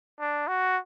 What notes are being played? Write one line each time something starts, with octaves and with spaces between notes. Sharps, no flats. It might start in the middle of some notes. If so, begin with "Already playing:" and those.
D4
F#4